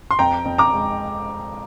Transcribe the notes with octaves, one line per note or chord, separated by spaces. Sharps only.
C6
F2 G5 A#5
F2
A#5 D6
G#3